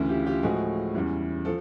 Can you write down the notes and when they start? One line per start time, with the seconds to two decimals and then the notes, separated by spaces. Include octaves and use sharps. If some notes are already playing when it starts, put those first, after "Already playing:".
Already playing: D2 C#3 E3
0.09 F4 G4
0.26 F4 G4
0.43 A2 F3 G#3 F#4 G#4
0.94 E2 C#3 E3 G3
1.45 F3 A4